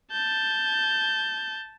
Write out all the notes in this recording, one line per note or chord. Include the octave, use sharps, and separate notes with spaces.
A5 G6